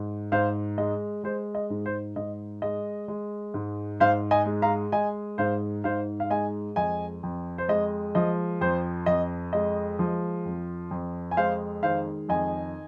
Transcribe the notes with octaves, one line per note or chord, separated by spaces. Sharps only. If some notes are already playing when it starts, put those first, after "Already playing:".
Already playing: G#2
G#2 C5 F5
G#3 D#5
G#3 C5
D#5
G#2
C5
G#2 D#5
G#3 D#5
G#3
G#2
G#2 C5 F5
D#5 G#5
G#3
F5 A#5
G#3 D#5 G#5
G#2 C5 F5
G#2 C5 F5
F5
G#3 D#5 G#5
F2 D#5 G#5
F2
C5
G#3 D#5
F3 D#5
F2 C5
F2 D#5
G#3 D#5
F3
F2
F2
G#5
G#3 C5 F5
D#3 C5 F5
F2 D#5 G#5